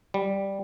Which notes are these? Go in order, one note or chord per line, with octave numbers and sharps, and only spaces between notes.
G3